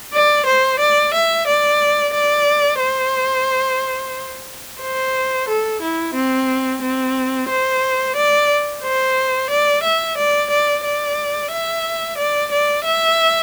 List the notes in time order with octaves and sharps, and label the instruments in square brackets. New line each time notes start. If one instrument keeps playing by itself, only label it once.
[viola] D5
C5
D5
E5
D5
D5
C5
C5
A4
E4
C4
C4
C5
D5
C5
D5
E5
D5
D5
D5
E5
D5
D5
E5